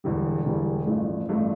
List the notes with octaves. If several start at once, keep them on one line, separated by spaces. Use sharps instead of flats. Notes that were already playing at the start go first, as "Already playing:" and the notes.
E1 E2 D3 G3
E1 E2 D3 G3
A1 G2 F3 A3
A1 G2 F3 A3